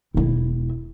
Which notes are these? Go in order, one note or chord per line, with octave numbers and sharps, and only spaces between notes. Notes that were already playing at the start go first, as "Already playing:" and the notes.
E1 E4